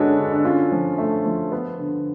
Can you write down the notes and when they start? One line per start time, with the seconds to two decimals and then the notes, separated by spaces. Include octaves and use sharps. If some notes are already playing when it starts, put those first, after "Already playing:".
Already playing: D3 G#3 C#4 D4 F#4 A4 B4 C#5
0.18 D3
0.31 D4
0.45 C#4 F4
0.72 F3
0.98 A3
1.25 F3
1.52 B3
1.79 D3